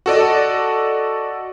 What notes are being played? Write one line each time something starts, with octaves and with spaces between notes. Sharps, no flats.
F#4 A4 D5 D#5